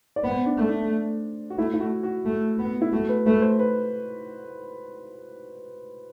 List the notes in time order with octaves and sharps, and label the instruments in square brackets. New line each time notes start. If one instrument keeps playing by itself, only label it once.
[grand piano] D5
[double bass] B3 [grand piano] C5
[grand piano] D4
[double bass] A3
[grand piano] D4
F#4
[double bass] A3 [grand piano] E4
[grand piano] E4
F#4
F#4
[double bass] A3
B3
[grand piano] E4
[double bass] A3 [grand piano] F#4
[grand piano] B4
[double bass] A3 [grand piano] B4
[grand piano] C5
B4